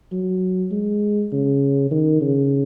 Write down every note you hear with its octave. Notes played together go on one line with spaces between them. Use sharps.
F#3
G#3
C#3
D#3
C#3